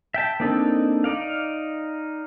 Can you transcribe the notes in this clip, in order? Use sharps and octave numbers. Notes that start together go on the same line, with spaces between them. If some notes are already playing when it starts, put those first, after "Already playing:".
E5 G5 A5
A#3 C4 D4 D#4 A4
D#4 D5 F5